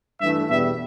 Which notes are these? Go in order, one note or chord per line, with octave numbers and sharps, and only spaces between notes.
G2 E3 A3 E5
E2 B2 G3 B3 E5